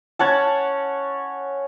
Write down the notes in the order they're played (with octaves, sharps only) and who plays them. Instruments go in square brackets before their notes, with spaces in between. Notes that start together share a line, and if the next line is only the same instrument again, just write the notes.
[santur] C#4 C#5 F#5 A5